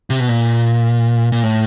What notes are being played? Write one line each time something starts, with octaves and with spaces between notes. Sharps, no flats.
C3
B2
A#2
A#2
A2